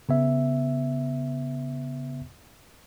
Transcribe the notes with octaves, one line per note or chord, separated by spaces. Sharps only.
C#3 B3 E5